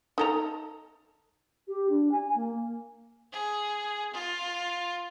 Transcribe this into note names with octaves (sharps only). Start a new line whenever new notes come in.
D#4 A4 A#5
G4
D4
G#5
A#3
G#4
F4